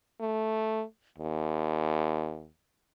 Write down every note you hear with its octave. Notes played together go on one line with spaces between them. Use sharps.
A3
D#2